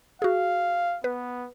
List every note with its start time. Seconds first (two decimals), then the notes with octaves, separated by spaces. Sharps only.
0.22 F#4 G#4 F5
1.04 B3 B4